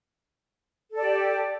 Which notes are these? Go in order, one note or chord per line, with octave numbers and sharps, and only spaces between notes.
G4 A4 D5